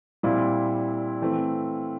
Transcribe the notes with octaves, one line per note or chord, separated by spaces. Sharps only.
A#2 G3 C4 E4
E3 A3 C4